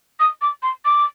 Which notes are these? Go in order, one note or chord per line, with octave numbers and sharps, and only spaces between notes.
D#6
D6
C6
D6